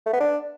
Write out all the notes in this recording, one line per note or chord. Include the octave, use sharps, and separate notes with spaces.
A3
B3
D4